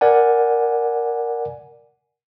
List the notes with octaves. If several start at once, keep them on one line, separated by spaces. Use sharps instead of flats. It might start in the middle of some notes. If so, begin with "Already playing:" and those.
A#4 D5 F#5 G#5